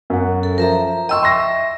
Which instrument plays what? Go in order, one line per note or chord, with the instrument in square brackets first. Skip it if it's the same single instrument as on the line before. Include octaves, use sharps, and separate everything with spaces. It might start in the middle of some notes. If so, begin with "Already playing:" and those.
[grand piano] F#2 F#5
[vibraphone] A4
[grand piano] F3 [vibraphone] A#4 E5 A#5
[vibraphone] D#5 C6 C#6 [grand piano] G5 E6
[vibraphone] E5 [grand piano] C6 A#6